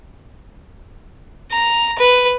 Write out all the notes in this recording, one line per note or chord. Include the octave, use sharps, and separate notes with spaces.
A#5
B4